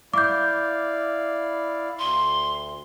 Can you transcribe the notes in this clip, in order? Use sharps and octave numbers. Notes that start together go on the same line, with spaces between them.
E4 D5 F5 D6 G6
D2 C6